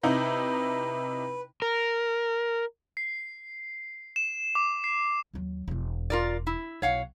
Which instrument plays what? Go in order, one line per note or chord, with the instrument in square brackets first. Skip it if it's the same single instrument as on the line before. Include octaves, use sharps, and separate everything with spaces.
[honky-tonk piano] C3 D#4 E4 [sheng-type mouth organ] B4
[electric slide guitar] A#4
[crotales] C7
E7
D6
C7
[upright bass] D#2 F#3
E1 E2
[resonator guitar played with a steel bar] F4 A#4 D5
E4
[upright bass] B1 [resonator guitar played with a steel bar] C#5 F5 F#5